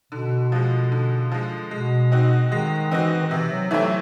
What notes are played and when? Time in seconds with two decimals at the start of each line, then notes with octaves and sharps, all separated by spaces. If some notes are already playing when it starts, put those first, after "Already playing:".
0.12 B2 D3
0.52 F3 G#3
0.92 D3
1.32 F3 G#3
1.71 B2 G#3
2.12 C4 D#4 F#4
2.51 D#3 G#3
2.91 E3 C4 D#4 F#4
3.22 D#3
3.31 C3 E3
3.51 F#3
3.71 E3 F#3 A3 C4 E4